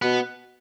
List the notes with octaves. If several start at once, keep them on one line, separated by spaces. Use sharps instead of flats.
B2 B3